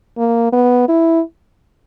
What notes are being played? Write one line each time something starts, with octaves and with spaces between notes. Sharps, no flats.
A#3
B3
E4